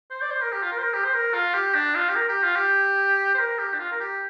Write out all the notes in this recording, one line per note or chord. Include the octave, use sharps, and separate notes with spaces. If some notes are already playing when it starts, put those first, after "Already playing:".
C5
D5
C5
A#4
G4
F4
A#4
C5
A#4
G4
C5
A#4
F4
G4
D4
F4
G4
A#4
G4
F4
G4
C5
A#4
G4
D4
F4
A#4
G4